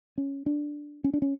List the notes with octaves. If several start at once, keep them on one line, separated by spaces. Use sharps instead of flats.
C#4
D4
C#4
D4
C#4